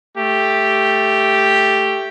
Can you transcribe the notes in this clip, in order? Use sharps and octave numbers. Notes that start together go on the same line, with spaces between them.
A3 G4